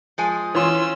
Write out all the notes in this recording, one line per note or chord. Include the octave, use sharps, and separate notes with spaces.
F3 G#3 G#5
E3 C#4 F4 C#5 C6 E6